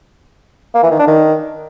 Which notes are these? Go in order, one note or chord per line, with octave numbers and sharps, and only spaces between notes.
A#3
E3
D#3
D4
D#3